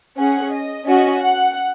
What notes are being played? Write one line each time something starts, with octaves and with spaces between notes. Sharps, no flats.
C#4 G#4 F#5
D#5
C#4 F#4 D#5
F#5